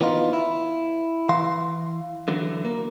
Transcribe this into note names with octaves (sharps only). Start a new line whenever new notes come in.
E3 B3 D#4 F4
E4
E3 F5 C6
D3 E3 F#3
A#3